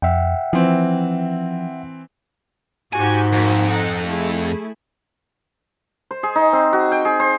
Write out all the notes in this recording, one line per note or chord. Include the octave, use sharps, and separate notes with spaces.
F2 E5 F#5 G5
E3 F3 C4
G#2 F#4 G4 G#5
F2 A#3 F#4
D#4 A4 F#5
A3 E4 G#4
C5
G#4
D#4
C4
F#4
G5
G#4
C5